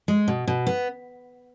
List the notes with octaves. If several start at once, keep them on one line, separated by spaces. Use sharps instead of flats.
G#3
B2
B2
B3